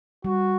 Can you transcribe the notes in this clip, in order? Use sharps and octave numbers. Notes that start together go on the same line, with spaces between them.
G3 F#4